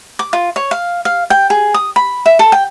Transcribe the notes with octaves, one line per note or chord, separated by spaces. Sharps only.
D6
F4
C#5
F5
F5
G5
G#4
D#6
B5
E5
A4
G5